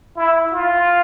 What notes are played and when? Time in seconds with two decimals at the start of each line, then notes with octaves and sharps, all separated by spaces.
0.17 E4
0.53 F4